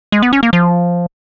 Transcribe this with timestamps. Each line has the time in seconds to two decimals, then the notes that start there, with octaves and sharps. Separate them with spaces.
0.12 G#3
0.23 B3
0.33 C#4
0.43 A#3
0.53 F3